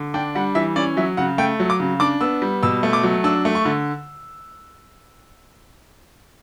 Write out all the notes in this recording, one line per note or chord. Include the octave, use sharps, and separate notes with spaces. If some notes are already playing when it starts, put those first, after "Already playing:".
Already playing: D3
D4 G5
G3 F#5
E3 E5
C#4 D5
F#3 E5
C#3 F#5
A3 G5
F#3
D6
C#3
D4 D6
B3 E6
G3
B2 E6
A3
D6
F#3
D4 E6
A3
C#6
D3